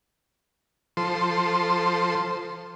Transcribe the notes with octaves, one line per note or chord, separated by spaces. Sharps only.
F3 A4 C5 C6